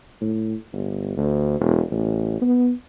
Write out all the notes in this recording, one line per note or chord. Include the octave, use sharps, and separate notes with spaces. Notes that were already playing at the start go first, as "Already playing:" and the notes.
A2
G1
D2
E1
A1
B3